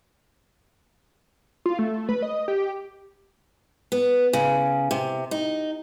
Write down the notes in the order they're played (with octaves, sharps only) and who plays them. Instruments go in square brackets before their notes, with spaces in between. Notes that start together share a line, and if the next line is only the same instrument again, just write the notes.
[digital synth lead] F4
A3
B4
D#5
G4
[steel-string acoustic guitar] B3
C#3
C3
D#4